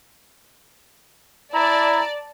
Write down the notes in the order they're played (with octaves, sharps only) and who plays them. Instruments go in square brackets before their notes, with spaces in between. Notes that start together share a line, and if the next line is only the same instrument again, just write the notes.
[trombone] E4 [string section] D5 A5 [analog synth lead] A#5